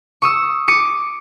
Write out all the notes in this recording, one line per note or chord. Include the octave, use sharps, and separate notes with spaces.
C#6 D#6 E6
D6 C#7 D#7